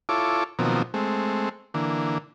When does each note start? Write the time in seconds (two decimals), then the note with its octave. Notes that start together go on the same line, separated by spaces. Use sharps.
0.09 E4 F4 A4 C#5 D6
0.59 B2 D#3 F3 F#3 A#3 C4
0.94 G#3 A3 C4
1.74 D3 E3 A#3